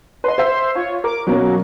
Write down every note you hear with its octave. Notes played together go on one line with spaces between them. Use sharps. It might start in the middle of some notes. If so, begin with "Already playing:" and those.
B4 D#5 C6
C5 E5
F4 C#5
A#4 D6
B2 F#3 A#3 C#4